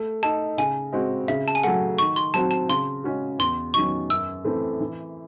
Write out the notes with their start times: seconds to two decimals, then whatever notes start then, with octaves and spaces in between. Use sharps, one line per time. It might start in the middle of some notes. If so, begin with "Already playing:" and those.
Already playing: A3
0.23 D#4 A4 A5
0.58 C#3 G#5
0.92 G#3 C4 F#4
1.28 C#3 E5
1.48 A5
1.55 G#5
1.64 F#3 A3 F#5
1.98 D#3 C#6
2.16 C6
2.34 F#3 C4 F#4 A5
2.51 A5
2.69 C#3 C6
3.04 G#3 C#4 F#4
3.39 E2 C6
3.74 D#3 F#3 C#4 C#6
4.10 F#2 E6
4.45 E3 A3 C4
4.80 E3